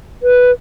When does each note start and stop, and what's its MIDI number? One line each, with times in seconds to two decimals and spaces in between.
0.23 0.51 71